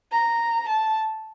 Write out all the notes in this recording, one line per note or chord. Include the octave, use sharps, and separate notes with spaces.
A#5
A5